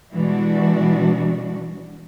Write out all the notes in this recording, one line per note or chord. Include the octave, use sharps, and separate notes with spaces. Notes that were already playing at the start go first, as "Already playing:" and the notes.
B2 E3 G3 G#3 D4 F#4